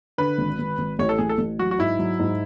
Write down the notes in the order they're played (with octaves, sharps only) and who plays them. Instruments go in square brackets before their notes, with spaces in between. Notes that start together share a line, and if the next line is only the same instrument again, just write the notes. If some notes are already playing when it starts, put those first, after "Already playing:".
[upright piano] D3 [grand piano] B4
[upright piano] G#1
G#1
G#1
[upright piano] A1 [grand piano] C#5
[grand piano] A4
[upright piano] A1 [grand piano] G#4
[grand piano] A4
[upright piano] A1
[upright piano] F#3 [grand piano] F#4
[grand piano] F#4
[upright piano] G#2 [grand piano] E4
[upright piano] F#3
G#2